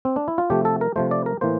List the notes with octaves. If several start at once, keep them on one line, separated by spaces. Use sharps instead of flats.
C4
D4
E4
F4
C3 F3 A3 G4
A4
A#4
C3 F3 A3 C5
D5
A#4
A2 E3 A#3 C5